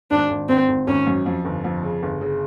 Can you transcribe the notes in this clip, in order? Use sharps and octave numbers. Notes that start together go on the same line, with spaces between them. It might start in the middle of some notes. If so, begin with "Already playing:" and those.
G#1 D4
G#1
G#1 C4
G#1
G#1 C#4
F#2
F2
G1
F2
C#3
G1
C#3